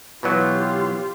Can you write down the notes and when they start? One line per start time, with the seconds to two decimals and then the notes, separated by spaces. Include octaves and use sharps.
0.23 B2 E3 F#3 F4 G4